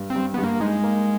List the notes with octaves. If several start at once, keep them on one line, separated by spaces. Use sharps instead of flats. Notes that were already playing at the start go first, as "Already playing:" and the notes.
Already playing: G2
C4
G2
G2 B3
A#3
G#3 D#4
A#3